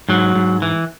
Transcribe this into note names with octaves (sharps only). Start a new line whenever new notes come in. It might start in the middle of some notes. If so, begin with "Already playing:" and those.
G#2 F#3
G#2
E3